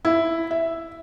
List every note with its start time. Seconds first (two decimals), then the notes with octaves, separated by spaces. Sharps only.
0.05 E4
0.51 E5